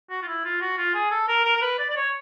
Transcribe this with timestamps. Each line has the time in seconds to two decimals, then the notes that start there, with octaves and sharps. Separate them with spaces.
0.10 F#4
0.22 F4
0.27 E4
0.44 F4
0.61 F#4
0.78 F4
0.94 G#4
1.11 A4
1.28 A#4
1.45 A#4
1.56 A#4
1.62 B4
1.79 D5
1.90 D5
1.96 C#5